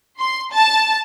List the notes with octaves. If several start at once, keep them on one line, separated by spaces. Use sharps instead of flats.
C6
A5